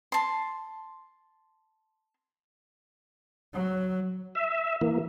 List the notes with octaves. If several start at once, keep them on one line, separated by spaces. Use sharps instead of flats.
A5 C6
F#3
E5
E3 A#3